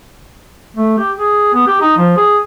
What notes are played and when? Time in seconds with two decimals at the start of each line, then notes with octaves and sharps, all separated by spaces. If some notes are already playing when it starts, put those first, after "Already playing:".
0.76 A3
0.98 G4
1.18 G#4
1.53 B3
1.67 G4
1.81 D#4
1.97 F3
2.17 G#4